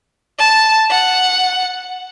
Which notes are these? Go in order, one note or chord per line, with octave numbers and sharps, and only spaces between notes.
A5
F#5